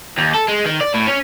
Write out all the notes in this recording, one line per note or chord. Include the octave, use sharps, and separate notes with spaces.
D#2
A4
G#3
D#3
D5
A2
C#4